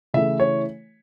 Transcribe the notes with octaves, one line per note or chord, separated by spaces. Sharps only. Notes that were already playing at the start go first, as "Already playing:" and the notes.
C#3 E3 A3 E4 E5
C#5